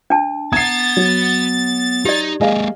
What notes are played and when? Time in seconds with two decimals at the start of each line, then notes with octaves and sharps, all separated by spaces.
0.10 D4 A5
0.53 B3 F#5 A#5 G#6 A6 C7
0.97 F#3
2.05 D#4 G4 D5
2.41 G#3 A#3 G#4 D#5 F5